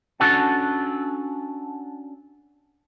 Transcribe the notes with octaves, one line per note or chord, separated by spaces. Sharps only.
C#4 D4 F#4 A4 F#5 A5